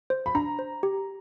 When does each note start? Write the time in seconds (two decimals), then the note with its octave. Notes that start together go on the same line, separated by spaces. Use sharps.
0.10 C5
0.26 B5
0.35 D4 A#5
0.59 C5
0.83 G4